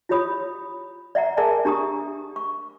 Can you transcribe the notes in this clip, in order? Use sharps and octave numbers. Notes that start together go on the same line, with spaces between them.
E4 F4 G4 C#5 B5 D#6
D5 E5 F#5 A#5
G#4 A#4 D5 E5 G#5 A5
D4 G4 A#5 C#6 D#6
C#6